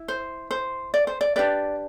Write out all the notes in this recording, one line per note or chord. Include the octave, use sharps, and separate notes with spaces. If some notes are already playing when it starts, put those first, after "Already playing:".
Already playing: E4
C5
C5
D5
C5
D5
D4 G4 B4 D5